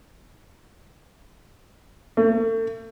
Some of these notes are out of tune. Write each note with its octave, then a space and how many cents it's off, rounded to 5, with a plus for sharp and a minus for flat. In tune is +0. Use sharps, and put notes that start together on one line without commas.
A3 +40